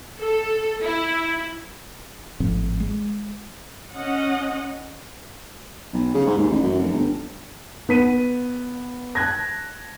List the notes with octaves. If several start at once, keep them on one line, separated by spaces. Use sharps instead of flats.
A4
E4
G#1 A2 F3 C4
G#3
C#4 D#5 F#5
B1
C#3
G#2
D#2
A1
F#2
F1
G1
B3 B6 D#7
A5 F#6 G#6 A#6